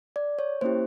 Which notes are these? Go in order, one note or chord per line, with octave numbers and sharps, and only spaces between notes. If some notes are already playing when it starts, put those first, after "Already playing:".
D5
C#5
A#3 C#4 E4 G4 C5